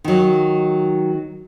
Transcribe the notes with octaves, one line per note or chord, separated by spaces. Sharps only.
D#3 F#3